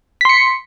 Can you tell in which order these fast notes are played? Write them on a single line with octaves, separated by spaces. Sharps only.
B6 C6 C#7